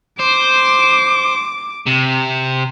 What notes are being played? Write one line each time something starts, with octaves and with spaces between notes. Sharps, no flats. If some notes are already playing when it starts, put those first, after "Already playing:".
C5 D6
C3